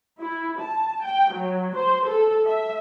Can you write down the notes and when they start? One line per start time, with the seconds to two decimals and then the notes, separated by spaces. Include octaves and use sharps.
0.19 E4
0.59 A5
1.03 G5
1.34 F#3
1.76 C5
2.06 A4
2.48 E5